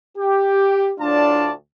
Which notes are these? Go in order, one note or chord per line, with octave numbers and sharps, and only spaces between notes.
G4
D2 A2 D4 F4 D5 A5